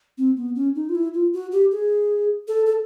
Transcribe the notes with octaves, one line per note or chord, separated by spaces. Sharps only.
C4
B3
C#4
D#4
F4
E4
F4
F#4
G4
G#4
A4
A4